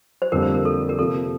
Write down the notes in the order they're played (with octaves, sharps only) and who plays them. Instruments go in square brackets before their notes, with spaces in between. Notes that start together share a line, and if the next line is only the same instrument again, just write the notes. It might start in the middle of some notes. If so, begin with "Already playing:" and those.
[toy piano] C5
[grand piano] F2 D3 G3 A#3 [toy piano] A#4
[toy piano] C5
A#4
A4
A#4
[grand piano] C3 F3 A#3 [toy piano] A4